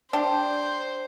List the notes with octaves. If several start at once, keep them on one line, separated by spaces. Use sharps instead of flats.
D4 G4 C5